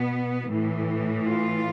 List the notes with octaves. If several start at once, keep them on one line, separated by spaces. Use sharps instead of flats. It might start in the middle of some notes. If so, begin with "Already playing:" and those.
Already playing: B2 B3
A2 E3
F4